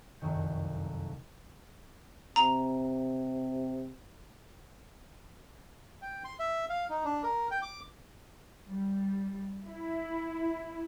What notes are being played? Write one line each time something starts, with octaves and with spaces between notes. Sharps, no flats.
F1 C2 F#2 D#3 C#6 G6
C3 A#5
G5
C6
E5
F5
D#4
D4
A#4
G5
D6
G3
E4